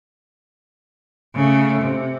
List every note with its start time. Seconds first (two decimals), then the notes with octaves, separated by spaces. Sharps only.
1.35 C#3 A3
1.81 C3